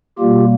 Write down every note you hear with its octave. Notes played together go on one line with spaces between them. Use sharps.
B2 G3 A#3 F4 G4